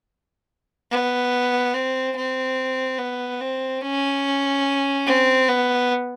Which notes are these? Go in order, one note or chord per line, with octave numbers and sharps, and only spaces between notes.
B3
C4
C4
B3
C4
C#4
C4
B3